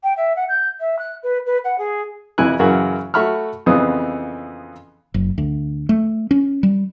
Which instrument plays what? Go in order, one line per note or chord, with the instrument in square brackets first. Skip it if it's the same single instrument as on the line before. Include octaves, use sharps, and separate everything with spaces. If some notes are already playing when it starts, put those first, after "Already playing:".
[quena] G5
E5
F#5
G6
E5
F#6
B4
B4
F#5
G#4
[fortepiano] F2 C3 E3 E4 G#5 F#6
F#2 C#3 E3 F#4 A#4
A3 F#4 E5 B5 C#6 F6
F2 C#3 E3 B3 C4 D#6
[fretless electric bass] F#1
D2
A3
C#4
G3